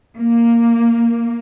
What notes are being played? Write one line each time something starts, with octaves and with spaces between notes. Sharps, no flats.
A#3